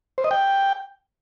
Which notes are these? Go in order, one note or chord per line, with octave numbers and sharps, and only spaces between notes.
C5
D#5
G5